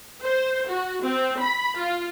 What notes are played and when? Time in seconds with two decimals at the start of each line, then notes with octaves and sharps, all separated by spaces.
0.22 C5
0.68 F#4
1.02 C4
1.40 B5
1.77 F4